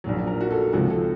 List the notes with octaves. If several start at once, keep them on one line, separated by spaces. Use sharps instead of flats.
A#1 A#2 F#3
A#4
F#4
A4
C#2 C3 F3 F#4
A4